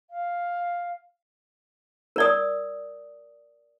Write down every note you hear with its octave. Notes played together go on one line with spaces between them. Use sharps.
F5
A#4 D5 D#6